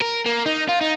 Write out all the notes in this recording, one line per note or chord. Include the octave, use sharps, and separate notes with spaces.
A#4
A#3
D#4
F4
D#4